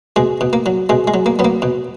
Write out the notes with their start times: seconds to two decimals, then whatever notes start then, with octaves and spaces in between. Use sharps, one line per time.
0.16 B2 G#3
0.41 B2
0.53 A#3
0.66 F#3
0.89 B2 G#3
1.08 G#3
1.14 F#3
1.26 A#3
1.39 F#3 B3
1.45 A#3
1.62 B2